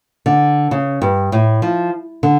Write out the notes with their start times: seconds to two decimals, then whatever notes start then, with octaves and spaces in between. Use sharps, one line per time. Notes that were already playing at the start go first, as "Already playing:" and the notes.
0.26 D3
0.71 C#3
1.02 G2
1.32 A2
1.62 F3
2.23 D3